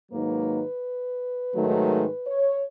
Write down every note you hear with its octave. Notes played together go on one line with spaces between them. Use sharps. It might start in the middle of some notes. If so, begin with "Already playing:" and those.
G#2 D#3 F#3 A#3 D#4 B4
G#2 D#3 F#3 A3
C#5